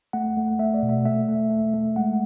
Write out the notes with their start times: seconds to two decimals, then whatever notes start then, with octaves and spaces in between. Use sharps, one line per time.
0.13 A3 F#5
0.37 A3
0.59 A3 E5
0.74 D5
0.83 B2
0.89 E5
1.05 A3 E5
1.28 A3
1.50 A3
1.74 A3
1.96 G#3 F#5